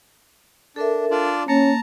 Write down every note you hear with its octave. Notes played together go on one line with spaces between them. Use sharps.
D4 A4 A#4 E5
D4 F4 D5
A#3 C#4 A5 A#5